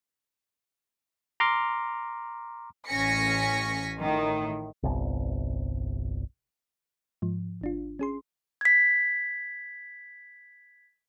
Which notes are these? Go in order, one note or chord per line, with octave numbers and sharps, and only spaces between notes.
A#5 C6 D6 F6
A1 C#4 G#5 A#6 B6 C#7
A2 D#3
G1 C2
G#2 F3
G#1 D4 F4
C#4 G#4 C6
G#6 B6